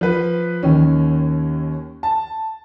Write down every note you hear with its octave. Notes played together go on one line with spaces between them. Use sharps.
F3 B4
D#2 D#3 C#4
A5